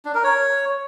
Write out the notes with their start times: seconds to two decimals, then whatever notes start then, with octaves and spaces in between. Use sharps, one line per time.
0.05 D4
0.14 A#4
0.24 C#5